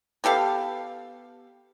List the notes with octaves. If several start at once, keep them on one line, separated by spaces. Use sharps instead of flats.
B3 G4 A4 F5